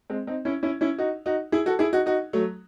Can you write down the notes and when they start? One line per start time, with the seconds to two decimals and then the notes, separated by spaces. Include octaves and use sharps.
0.10 G#3 C4
0.27 C4 D#4
0.45 C#4 E4
0.63 C#4 E4
0.81 C#4 E4
0.98 D#4 F#4
1.26 D#4 F#4
1.52 E4 G#4
1.66 F#4 A4
1.79 E4 G#4
1.93 D#4 F#4
2.06 D#4 F#4
2.33 F#3 A3